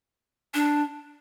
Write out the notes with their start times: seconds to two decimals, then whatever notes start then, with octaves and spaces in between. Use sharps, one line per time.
0.54 D4